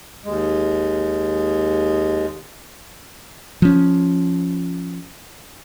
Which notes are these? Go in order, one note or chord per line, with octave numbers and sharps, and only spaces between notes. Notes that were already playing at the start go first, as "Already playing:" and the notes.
D#2 G#3
F3 C#4